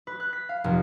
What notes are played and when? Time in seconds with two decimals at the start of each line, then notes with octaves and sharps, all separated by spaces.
0.07 B4
0.20 F#6
0.33 B6
0.49 F5
0.64 F1